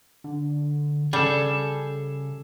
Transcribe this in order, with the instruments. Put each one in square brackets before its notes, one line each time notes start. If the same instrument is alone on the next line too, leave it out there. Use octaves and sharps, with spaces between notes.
[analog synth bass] D3
[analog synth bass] C#3 [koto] G3 [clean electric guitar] G#4 A4